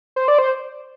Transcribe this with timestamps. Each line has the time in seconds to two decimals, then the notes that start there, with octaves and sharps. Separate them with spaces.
0.16 C5
0.28 D5
0.38 C5